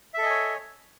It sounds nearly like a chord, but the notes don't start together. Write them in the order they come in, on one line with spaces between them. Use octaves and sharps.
E5 A4 D#5 G#5 C#5